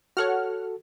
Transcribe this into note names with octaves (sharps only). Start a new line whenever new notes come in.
F#4 A4 C#5 F#5 F6